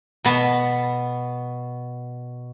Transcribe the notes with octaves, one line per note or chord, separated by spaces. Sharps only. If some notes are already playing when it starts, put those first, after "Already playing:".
B2 B3 A5